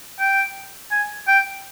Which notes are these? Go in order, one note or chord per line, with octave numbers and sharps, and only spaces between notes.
G5
G#5
G5